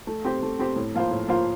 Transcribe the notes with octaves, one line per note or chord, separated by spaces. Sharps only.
A3
C4 G4 C5
A3
C4 G4 C5
A2
F3 A#3 F4 C5
A2
F3 A#3 F4 C5